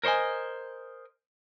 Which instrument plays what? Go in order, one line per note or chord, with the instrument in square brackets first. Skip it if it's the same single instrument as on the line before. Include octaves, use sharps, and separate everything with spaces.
[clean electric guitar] A#4 C5 C#5 D#5 G#5